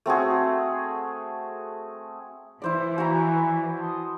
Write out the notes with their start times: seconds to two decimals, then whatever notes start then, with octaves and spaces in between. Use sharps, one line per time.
0.06 A3 C4 F#4 G#4
2.62 E3 E4 C5 D5
2.98 E4 F#4 B4 G#5 A#5
3.78 A5 C6 D#6